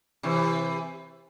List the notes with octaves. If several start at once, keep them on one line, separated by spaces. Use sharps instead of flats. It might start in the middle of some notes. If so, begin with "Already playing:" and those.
C3 E3